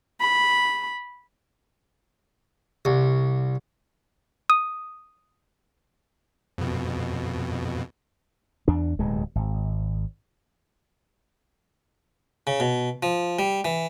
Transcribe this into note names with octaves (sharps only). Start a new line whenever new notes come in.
B5
C2
D#6
F2 B2
E2 D4
D1 D#2 B2 G#3
G#1
C#3
B2
F3
G3
E3